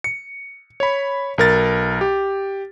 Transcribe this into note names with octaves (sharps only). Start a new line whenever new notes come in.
C#7
C#5 B5
B1 A#4 A6
G4